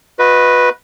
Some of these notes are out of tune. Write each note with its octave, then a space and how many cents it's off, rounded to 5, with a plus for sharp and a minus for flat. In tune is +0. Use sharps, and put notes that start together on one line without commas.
F#4 -40 B4 +0 D#5 +10